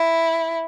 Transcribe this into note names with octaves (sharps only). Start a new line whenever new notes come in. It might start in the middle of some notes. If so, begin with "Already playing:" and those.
Already playing: E4